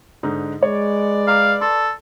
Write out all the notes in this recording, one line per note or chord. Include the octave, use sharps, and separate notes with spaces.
G#2 D3 D#4
G#3 B4 C#5 D5
F5 A#5 D6
A4 A5 C6